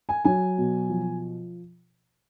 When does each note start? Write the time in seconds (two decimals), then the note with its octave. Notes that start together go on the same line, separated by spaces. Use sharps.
0.09 G#5
0.25 F#3 G#5
0.58 B2
0.89 F3